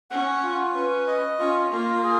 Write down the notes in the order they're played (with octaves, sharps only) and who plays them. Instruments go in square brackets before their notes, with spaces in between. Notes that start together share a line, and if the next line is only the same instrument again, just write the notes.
[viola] C#4 [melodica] F#5
[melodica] F4
[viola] C#4 [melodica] B4
[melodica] D#5
[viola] C#4 [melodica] F4
[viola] A#3 [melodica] F4
[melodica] G#4